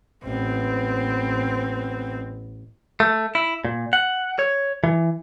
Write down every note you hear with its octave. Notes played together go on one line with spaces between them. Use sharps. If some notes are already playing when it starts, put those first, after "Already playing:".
A1 B3 C4
A3
E4
A#2
F#5
C#5
E3